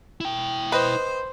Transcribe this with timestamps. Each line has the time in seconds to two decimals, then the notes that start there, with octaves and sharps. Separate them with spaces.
0.20 E4 G5
0.72 B4 C5 D#5